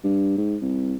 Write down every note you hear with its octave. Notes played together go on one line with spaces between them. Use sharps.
G2
G#2
C2